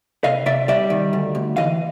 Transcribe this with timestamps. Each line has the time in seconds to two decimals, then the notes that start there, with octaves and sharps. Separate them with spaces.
0.24 C3 D#5 F5
0.46 C3 D5 E5
0.68 G3 D5 E5
0.90 D#3
1.13 D2
1.35 D2
1.56 E3 D#5 F5